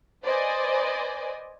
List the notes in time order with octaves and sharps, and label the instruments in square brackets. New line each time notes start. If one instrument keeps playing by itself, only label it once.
[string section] B4 C5 D5 D#5 G#5